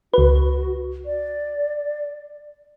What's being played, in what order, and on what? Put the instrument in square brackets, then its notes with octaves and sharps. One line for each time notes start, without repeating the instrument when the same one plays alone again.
[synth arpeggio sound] C#2 B4 [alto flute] F#4
[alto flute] D5